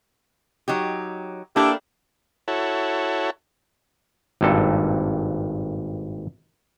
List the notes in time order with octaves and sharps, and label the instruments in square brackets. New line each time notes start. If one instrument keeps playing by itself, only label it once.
[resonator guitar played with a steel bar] F#3 D#4 G4
[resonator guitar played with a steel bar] A#3 A4 [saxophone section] D4 E4 G4
[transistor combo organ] E4 F#4 A4 C#5
[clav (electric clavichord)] G#1 G2 A#2 A4